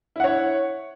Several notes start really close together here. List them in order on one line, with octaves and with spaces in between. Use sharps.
E4 F#5 C#5